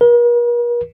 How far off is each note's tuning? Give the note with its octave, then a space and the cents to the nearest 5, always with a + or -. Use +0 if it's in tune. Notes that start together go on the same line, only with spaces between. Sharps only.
A#4 +45